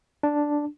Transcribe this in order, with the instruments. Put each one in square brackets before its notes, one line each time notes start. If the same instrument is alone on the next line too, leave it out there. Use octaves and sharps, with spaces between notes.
[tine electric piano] D4